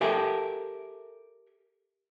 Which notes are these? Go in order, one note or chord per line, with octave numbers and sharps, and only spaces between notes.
G4 A4 A#4 E5 G5 G#5